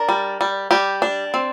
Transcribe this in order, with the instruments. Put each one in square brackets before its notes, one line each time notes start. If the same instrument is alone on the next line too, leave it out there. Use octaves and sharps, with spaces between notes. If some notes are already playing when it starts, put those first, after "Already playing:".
Already playing: [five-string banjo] D4 A#4
G3
G3
G3 G4
D4
C4